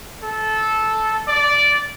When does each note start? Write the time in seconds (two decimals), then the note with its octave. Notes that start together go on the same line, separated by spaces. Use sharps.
0.23 A4
1.28 D5